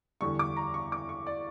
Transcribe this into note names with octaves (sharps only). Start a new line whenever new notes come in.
E2 D3 G3 C#6
D6
A#5
C#6
D6
C#6
D5